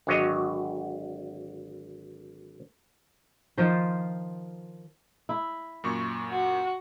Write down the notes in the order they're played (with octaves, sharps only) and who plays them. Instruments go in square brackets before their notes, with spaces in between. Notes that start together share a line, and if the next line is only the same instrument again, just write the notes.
[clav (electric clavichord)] G#1 D3 F#3 F#4 C#5 D#5
[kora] D#3 F3 F4 C5
E4
[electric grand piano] F#2 A#2 C#6
[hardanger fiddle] F#4